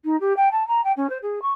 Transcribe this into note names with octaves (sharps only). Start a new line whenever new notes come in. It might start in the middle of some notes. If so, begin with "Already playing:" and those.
D#4
G4
G5
A5
A#5
G5
C#4
C5
G#4
C#6